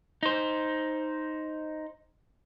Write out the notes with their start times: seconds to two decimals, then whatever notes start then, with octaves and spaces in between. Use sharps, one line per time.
0.23 D#4 C5